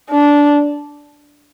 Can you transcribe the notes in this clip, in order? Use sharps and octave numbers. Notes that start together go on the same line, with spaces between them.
D4